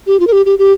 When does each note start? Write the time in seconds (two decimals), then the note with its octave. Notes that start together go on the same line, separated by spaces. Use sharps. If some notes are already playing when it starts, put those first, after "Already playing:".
0.07 G4
0.20 F4
0.27 A#4
0.32 G4
0.46 G4
0.59 G4